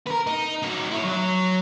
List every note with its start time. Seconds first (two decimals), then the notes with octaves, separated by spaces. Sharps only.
0.07 A#4 B4
0.27 D#4
0.62 D#4 F#4
0.91 E4 C#5
1.04 F#3 C#5